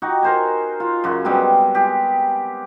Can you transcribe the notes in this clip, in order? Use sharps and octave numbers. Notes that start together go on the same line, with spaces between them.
D#4 F#4 G4
A#4 C5 G#5
F4
F#2 C#3 F#4
G3 G#3 B3 C4
G4 G#4